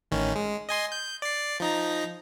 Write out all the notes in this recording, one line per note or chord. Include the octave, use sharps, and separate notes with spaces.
A1 D#3 C#4
G#3
D#5 G#5 C6
G6
D5 C7
F3 D#4 A#5